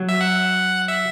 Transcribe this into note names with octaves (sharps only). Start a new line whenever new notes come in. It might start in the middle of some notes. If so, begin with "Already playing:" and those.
Already playing: F#3
E5
F#5
E5